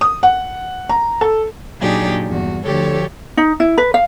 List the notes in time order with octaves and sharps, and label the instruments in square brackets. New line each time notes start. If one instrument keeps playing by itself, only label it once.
[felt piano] D#6
F#5
A#5
A4
[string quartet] A#2 F#3 D4 D#4 G4 G#4
E2 G2 F#4
D2 D3 F3 G4 A4 C#5
[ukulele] D#4
E4
B4
F5